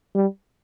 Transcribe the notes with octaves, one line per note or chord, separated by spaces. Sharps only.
G3